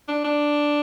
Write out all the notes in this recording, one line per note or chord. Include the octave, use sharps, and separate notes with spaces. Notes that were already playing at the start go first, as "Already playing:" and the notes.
D4
D4